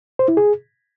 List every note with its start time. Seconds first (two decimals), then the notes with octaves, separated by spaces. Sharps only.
0.19 C5
0.28 E4
0.37 G#4